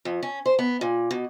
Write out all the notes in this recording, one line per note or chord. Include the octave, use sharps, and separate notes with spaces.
F2
C#4
C5
B3
A#2
B2